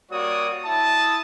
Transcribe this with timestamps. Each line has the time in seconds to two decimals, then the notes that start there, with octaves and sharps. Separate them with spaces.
0.12 G3 A#3 F#4 C#5 D5 D#6
0.66 E4 A5 D#6